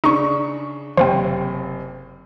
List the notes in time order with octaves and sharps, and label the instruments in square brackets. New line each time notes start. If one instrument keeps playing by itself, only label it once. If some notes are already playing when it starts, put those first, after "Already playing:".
[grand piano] C#3 D4 C#6 [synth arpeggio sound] D#4
[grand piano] F#1 C3 [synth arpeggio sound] C5 F5 G5